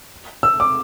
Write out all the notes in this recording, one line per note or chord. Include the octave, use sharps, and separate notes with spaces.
E6
D6